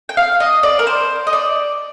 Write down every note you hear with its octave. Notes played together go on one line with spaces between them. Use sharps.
G5
F5
D#5
D5
A#4
C5
D#5
D5